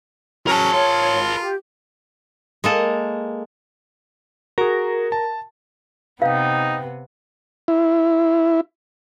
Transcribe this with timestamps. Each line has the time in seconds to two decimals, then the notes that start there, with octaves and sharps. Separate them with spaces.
0.47 F#3 C#4 A#4 A5
0.73 F4 C#5
1.40 G4
2.64 G#3 A#3 A4
4.58 F#4 G#4 A#4
5.12 A5
6.22 C3 B3 D#4 B4 F5 G5
7.68 E4